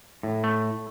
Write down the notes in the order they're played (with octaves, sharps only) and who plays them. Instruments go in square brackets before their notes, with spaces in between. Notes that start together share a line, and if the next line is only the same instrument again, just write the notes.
[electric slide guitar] A2
[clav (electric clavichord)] A3